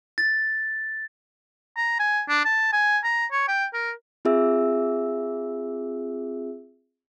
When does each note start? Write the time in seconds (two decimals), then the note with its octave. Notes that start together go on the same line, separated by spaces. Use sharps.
0.18 A6
1.77 A#5
1.99 G#5
2.29 D4
2.45 A5
2.73 G#5
3.04 A#5
3.32 C#5
3.48 G5
3.74 A#4
4.25 C4 F4 G#4 E5 E6